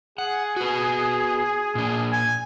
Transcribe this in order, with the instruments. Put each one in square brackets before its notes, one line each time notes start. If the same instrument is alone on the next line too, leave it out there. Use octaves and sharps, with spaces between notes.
[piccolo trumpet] G#4 [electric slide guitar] F#5
[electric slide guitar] F#4 B4
A#2 D4
[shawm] G#5